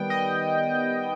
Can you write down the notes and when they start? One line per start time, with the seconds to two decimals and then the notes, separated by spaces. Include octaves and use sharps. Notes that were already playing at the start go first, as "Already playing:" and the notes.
Already playing: D#3 G3 B3 G5
0.10 D#5